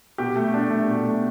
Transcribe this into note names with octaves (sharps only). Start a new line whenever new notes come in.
B2 G4
A3
D4
A3
B2
A3